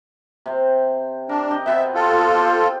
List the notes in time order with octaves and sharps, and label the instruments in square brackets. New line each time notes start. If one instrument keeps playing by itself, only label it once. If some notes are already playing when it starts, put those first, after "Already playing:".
[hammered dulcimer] C3 C4
[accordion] D4 [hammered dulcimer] A#4
[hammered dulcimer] G4 D#5
[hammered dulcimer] B2 B3 C4 [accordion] E5
[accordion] F4 A4
[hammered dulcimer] G4 C5